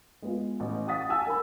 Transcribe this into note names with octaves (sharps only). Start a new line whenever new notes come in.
G#3 B3 F4
A1
F5 F#5 D#6 A6 B6
F5 F#5 G#5 A5 E6
A#4 B5